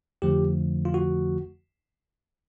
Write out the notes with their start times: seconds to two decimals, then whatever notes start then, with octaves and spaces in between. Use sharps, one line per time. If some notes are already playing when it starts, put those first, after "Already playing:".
0.22 F2 D3 F3 A3 G4
0.85 F4
0.94 F#4